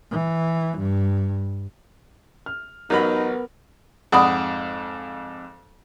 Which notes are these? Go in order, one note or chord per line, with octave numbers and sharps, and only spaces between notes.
E3
G2
F6
A1 F#3 B3 D#4 A#4 B5
F2 G#2 D5 F#5 B5 D#6